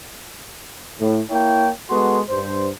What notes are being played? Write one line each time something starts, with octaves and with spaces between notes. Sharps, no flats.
A2
A#3 E4 C#5 G5
G#3 B3 F#4 A4 C6
G2 C5